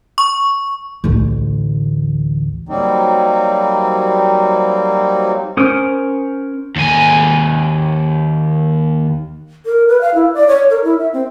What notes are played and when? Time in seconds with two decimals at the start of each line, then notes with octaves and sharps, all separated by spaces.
0.18 C#6
1.04 A1 D2
2.69 F#3 G3 A#3 C4 D#4
5.57 C#4 A#4 C5 D#6
6.76 D#2 G#5
9.66 A#4
9.89 B4
10.01 F5
10.15 E4
10.34 D5
10.48 C#5
10.70 A#4
10.84 E4
10.98 E5
11.13 C4